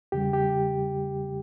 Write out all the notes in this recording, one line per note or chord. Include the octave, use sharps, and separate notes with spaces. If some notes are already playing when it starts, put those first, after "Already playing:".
E2 C#3 G3 G4
G4